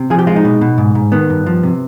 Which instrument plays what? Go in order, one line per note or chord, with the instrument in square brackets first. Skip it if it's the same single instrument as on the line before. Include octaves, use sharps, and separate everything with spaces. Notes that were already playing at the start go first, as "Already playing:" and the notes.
Already playing: [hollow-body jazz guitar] C3
F3 G#4
G4
G#3 F4
D#4
B2
B2
G#2
G#2
D#3 B3
G2
F3
C3